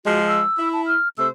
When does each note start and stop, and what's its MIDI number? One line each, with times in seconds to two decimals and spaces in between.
0.06 0.42 53
0.06 0.42 56
0.06 0.20 66
0.28 0.69 88
0.58 0.95 64
0.73 0.82 81
0.87 1.08 89
1.18 1.27 48
1.18 1.27 57
1.18 1.27 72
1.18 1.28 88